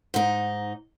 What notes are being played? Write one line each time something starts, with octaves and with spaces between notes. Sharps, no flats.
G#2 D#4